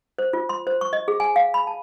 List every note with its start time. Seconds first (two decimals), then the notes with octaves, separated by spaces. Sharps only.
0.19 C5
0.33 F4
0.49 C6
0.67 C5
0.81 C#6
0.93 D#5
1.08 G#4
1.20 G#5
1.36 F5
1.54 B5
1.67 A5